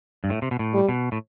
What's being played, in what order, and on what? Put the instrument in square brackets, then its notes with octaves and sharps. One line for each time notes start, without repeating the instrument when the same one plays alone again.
[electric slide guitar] G2
A2
C3
B2
A2
[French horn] G3
[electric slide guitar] B2
A2